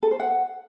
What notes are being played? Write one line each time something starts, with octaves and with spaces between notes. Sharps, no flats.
A4
C5
F#5